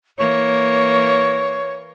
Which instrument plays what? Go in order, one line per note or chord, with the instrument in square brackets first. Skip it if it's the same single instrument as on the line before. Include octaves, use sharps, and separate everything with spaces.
[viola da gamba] E3 A#3 [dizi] C#5